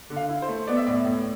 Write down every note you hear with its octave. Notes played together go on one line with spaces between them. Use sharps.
D3
F5
E4
C5
A3
B3 D5
E5
A2 D5
A2